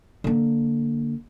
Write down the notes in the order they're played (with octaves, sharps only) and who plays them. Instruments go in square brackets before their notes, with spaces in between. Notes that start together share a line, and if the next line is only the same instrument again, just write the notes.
[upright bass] D3 A#3